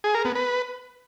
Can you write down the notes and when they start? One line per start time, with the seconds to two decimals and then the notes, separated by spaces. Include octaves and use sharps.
0.04 G#4
0.14 A#4
0.25 B3
0.35 B4